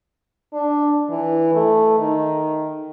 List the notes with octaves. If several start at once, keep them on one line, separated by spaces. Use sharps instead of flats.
D4
E3
A3
D#3